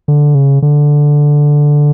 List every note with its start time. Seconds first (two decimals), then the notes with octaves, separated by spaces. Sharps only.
0.08 D3
0.35 C#3
0.62 D3